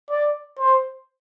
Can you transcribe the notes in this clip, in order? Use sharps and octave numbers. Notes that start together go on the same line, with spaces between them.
D5
C5